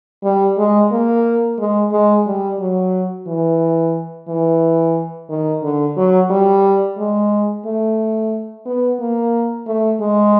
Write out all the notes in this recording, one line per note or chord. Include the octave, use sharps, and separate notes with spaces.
G3
G#3
A#3
G#3
G#3
G3
F#3
E3
E3
D#3
D3
F#3
G3
G#3
A3
B3
A#3
A3
G#3